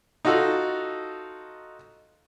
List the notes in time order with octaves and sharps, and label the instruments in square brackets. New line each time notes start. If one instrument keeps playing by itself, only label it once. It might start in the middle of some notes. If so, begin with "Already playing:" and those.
[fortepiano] D#4 F4 F#4 A4